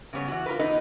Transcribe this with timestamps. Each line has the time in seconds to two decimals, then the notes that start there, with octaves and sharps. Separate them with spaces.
0.13 C#3 G3 B3 C#5
0.28 E3 F#4
0.46 F4 A#4 B4
0.59 E2 D#4 B4 D#5